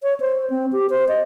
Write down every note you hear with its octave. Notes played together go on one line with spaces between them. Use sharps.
C#5
C5
C4
G4
C5
D#5